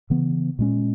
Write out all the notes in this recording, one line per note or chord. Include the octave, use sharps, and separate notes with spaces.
C#3 E3 B3
A#2 G#3 C#4